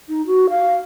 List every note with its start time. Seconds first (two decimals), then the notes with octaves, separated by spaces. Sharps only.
0.09 D#4
0.27 F#4
0.50 F5